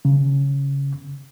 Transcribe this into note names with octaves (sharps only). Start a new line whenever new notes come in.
C#3